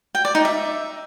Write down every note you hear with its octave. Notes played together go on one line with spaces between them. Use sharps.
G5
D5
D#4
E5